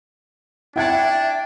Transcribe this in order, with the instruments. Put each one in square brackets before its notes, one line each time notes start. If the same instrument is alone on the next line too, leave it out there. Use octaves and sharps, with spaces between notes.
[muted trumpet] D4 [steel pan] E4 F#5 A5 [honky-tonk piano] E5 G#6 [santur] G5